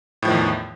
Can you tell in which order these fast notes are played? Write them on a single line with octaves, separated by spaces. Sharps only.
A2 F3 D#3 E2